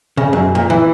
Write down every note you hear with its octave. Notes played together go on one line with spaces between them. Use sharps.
C#3
F#2
A#2
E3